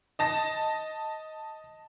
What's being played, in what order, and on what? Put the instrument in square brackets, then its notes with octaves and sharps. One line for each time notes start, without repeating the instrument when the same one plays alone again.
[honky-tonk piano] D#5 A5 A#6